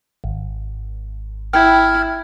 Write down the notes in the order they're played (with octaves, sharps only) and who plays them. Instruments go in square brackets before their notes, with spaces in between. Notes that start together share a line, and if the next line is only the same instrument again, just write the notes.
[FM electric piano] G#1
[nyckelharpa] E4 [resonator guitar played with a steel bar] G5 [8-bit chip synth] F6 G#6